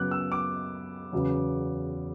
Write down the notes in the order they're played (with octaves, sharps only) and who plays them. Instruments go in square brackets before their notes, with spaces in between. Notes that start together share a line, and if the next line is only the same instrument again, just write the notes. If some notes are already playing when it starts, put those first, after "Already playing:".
Already playing: [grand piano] F#2 C#3 F#3 B3 D6 F#6
E6
D6
E2 C#3 F#3 B3